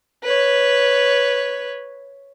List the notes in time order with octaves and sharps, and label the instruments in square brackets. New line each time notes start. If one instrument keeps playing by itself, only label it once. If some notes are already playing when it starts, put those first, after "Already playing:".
[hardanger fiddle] B4 C#5